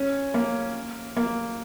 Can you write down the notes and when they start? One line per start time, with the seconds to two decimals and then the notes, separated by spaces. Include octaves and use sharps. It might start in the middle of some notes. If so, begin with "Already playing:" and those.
Already playing: C#4
0.34 A#3
1.17 A#3